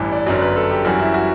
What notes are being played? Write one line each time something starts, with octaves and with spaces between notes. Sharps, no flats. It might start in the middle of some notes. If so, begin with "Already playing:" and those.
Already playing: A1 G2 E3
D5
G1 F#2 F#3 D5
B4
A4
G4
F#2 E3 G3 F#4
E4
F#4